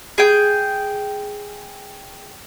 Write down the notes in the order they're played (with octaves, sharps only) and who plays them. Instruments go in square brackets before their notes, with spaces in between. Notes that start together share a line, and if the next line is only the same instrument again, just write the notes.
[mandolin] G#4 G5